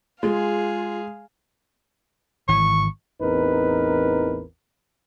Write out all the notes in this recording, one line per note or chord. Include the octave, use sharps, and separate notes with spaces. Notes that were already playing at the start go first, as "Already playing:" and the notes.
G#3 F4 G#4 F5
G#1 E3 C#6
A1 E2 C4 D#4 A#4 B4